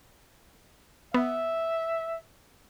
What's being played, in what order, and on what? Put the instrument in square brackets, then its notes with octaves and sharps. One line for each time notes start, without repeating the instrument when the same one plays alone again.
[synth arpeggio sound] B3 [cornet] E5